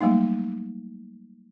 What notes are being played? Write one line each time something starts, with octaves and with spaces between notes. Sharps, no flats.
F#3 G3 A3 A#3 D#4